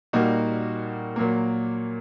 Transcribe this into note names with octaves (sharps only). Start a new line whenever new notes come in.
A#2 G3 A#3 D#4 F#4
A#2 F#3 A#3